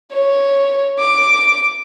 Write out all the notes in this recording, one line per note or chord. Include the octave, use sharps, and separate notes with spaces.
C#5
D6